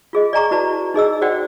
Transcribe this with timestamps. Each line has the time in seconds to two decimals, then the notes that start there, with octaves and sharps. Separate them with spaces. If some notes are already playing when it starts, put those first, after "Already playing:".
0.13 F4 G#4 D#5
0.33 D5 D#5 G#5 A#5 C#6 D6
0.51 E4 F#4 B4 D5 A5
0.94 D#4 G#4 D#5 E6
1.22 F#4 C5 D5 F#5 G5